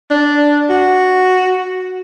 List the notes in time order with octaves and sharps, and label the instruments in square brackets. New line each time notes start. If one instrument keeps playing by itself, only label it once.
[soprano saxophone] D4
F#4